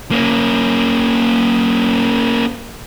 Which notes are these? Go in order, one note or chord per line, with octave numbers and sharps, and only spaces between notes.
A#3 C#4